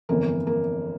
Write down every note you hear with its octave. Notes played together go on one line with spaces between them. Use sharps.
G1 F2 E3 A#3
A#3